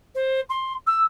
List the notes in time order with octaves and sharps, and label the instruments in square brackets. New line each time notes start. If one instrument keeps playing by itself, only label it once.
[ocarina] C5
C6
E6